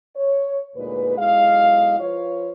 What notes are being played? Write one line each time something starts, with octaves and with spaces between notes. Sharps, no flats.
C#5
D2 A#2 G#3 D#4 B4
B1 G#3 E4 D#5 F5
F3 F4 B4 C#5